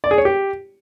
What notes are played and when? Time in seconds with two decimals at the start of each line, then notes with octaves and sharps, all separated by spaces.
0.04 D5
0.11 G#4
0.18 C#5
0.25 G4